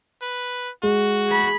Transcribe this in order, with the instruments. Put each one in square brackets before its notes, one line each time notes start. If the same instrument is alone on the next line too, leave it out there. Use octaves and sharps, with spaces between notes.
[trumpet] B4
[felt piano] G#3 [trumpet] F#4
[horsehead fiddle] G#4 B5